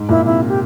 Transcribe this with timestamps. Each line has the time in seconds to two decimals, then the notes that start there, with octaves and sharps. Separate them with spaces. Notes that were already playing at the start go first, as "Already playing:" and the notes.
Already playing: G#2
0.09 A#2 E4
0.25 C3 E4
0.48 G4